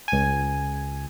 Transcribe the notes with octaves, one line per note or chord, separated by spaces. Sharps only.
C#2 G#5